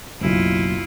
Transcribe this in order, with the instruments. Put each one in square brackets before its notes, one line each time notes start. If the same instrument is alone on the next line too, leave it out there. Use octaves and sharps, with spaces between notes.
[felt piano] F#1 B1 [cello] E4 F4